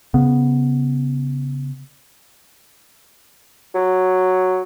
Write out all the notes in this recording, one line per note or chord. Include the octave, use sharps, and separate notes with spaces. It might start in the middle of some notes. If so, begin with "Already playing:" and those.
C#3 B3
F#3